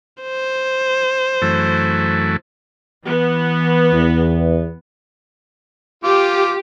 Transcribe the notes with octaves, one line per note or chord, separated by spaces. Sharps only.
C5
F#2 E3 A3
E3 B3
E2
F4 G4 D6